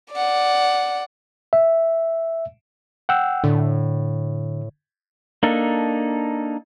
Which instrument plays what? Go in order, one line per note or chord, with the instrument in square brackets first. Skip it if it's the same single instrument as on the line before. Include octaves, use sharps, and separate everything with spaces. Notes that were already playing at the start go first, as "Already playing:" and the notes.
[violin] D5 F#5
[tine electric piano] E5
[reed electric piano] F#5 G5 E6
[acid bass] A2 [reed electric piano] D3
[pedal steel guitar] A#3 D4 D#4 A4